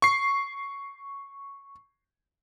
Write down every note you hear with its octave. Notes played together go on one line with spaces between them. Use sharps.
C#6 C7